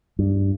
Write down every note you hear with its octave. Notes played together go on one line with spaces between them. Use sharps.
G2